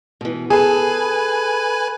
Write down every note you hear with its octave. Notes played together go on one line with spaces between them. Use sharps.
B2 E3
G#4 A4 B4 G#5